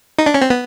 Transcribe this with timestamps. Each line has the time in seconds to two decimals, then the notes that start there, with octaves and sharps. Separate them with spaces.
0.18 D#4
0.26 D4
0.34 C#4
0.42 C4
0.50 B3